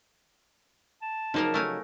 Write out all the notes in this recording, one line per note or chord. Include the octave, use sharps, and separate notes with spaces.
A5
C#3 F3 F#3 A#3 D#4 A#4
A3 A#4 G#5